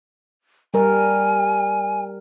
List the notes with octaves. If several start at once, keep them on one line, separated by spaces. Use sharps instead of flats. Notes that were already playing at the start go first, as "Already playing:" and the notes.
G3 A#4 G#5